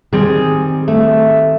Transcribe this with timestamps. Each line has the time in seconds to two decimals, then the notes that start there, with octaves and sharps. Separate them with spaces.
0.13 D#3 G3 C4 G#4
0.88 A3